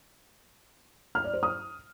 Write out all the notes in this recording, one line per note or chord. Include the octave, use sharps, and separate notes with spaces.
F6
D5
C5
D#6